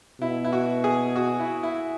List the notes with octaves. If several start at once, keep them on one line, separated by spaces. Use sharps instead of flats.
B2 E4
E4
F#4
G#4
F#4
E4
E4